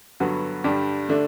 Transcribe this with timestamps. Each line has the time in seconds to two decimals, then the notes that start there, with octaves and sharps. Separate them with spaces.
0.20 G2 D3 F#3 B3 F#4
0.64 G2 D3 G3 D4 G4
1.09 D3 A3 D4